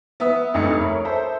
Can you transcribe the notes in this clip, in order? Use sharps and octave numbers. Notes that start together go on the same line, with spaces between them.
B3 E5 D#6
F1 D2 G2 D#4 D#6 C#7
A#4 C#5 E5 B5
A4 C5 E5